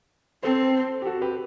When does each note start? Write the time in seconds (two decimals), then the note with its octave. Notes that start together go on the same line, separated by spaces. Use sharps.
0.43 C4 A4 C5
1.02 G4
1.05 F#4 A4
1.22 G4 B4